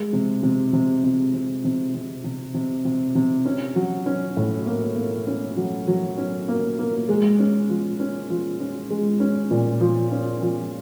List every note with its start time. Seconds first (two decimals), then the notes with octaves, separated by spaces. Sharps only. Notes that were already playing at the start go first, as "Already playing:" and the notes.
Already playing: G#3
0.13 C3
0.43 C3
0.73 C3
1.04 C3
1.34 C3
1.64 C3
1.94 C3
2.24 C3
2.54 C3
2.85 C3
3.15 C3
3.45 C#4
3.76 F#3
4.06 C#4
4.37 A2
4.66 A#3
4.96 A#3
5.27 C#4
5.57 F#3
5.88 F#3
6.17 C#4
6.48 A#3
6.79 A#3
7.09 G#3
7.39 C#4
7.69 F3
8.00 C#4
8.30 F3
8.60 C#4
8.90 G#3
9.20 C#4
9.51 A#2
9.81 F3
10.11 C#4
10.42 F3